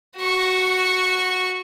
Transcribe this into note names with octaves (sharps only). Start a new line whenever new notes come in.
F#4 C#6